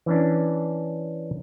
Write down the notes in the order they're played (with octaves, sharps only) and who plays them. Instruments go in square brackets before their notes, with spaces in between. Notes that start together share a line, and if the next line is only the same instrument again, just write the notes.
[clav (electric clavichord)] E3 C#4 D4